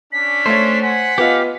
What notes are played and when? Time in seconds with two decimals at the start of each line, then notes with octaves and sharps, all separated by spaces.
0.12 C#4 D4 B6
0.46 A3 C5 C#5
0.82 F#5 G#5 B6
1.18 B3 F4 G4 D#5 F5